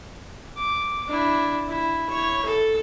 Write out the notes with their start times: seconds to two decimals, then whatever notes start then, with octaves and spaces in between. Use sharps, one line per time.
0.57 D6
1.08 D4 E4
1.68 E4
2.10 E4 C#5
2.45 A4